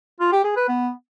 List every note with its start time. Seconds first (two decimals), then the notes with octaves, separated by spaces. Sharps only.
0.20 F4
0.32 G4
0.44 G#4
0.56 B4
0.68 B3